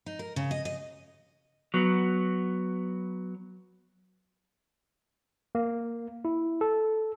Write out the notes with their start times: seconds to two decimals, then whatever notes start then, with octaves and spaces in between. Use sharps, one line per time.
0.06 D#4
0.19 A#4
0.36 C#3
0.51 D#5
0.65 D#5
1.74 F#3 B3
5.55 A#3
6.25 E4
6.61 A4